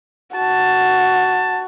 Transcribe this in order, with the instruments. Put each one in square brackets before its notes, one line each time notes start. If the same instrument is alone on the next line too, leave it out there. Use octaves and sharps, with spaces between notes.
[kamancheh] F#4 [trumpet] A5